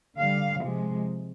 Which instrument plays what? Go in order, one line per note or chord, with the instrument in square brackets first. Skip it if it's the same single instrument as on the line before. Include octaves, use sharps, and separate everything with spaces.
[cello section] D3 G3 F5
C3 F3 G#3